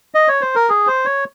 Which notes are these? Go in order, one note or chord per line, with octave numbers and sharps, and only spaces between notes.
D#5
C#5
C5
A#4
G#4
C5
C#5